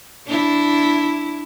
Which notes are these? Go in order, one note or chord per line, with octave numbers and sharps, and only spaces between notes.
D4 E4